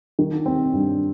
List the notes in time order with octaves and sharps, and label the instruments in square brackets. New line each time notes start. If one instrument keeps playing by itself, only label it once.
[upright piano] D#3
C4
G2